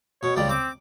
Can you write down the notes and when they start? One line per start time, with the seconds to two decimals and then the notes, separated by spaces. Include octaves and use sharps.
0.23 B2 C#5
0.37 C#2 G3 D5
0.49 C4 D6